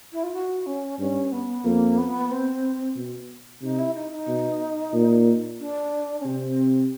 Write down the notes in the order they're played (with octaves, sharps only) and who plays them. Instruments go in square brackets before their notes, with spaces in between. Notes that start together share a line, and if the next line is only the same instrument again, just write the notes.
[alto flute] E4
F4
F#4
C#4
[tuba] G2 [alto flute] C#4
[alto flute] B3
[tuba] F2 [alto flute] A#3
[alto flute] B3
C4
[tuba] B2
[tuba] C3 [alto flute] D#4
[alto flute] E4
D#4
D#4
[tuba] B2
A#2
[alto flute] D4
C#4
[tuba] C3 [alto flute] C4